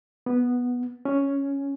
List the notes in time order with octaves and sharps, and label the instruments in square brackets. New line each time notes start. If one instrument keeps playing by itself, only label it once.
[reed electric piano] B3
C#4